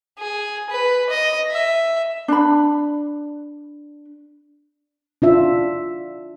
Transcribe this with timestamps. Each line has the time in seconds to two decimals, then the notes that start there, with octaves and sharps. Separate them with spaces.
0.19 G#4
0.70 B4
1.10 D#5
1.50 E5
2.28 D4 B5
5.22 D4 F4 E5